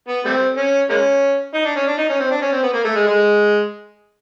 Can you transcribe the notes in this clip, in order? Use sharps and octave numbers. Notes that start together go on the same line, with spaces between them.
B3
G3 A3 C4
C#4
G#3 A#3 C#4
D#4
D4
C#4
D4
D#4
C#4
C4
D4
C#4
C4
B3
A#3
A3
G#3
G#3